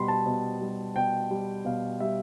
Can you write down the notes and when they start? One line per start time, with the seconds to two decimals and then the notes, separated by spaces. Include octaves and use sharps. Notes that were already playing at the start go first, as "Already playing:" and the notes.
Already playing: B2 G3 B5 C6
0.08 A5
0.26 B2
0.61 G3
0.95 B2 G5
1.31 G3
1.65 B2 F5
2.00 G3 E5